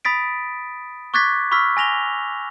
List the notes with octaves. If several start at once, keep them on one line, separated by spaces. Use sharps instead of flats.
B5 D#6 A6 B6 D7
C#6 D6 F#6 G#6 A6 B6
B5 C#6 E6 F6 B6
G#5 A#6 F7 G7